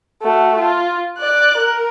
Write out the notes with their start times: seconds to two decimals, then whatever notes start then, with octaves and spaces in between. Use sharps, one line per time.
0.22 A3 F#4
0.59 F4
1.19 D5 F#6
1.58 A#4